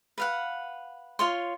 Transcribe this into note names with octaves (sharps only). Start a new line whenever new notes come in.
B4 F5 F#5
F4 C#5 C6